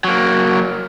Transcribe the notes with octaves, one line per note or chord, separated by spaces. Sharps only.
F#3 A#3